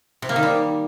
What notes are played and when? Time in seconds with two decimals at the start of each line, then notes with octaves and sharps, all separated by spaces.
0.22 C3
0.29 A#3
0.36 D#3
0.43 G3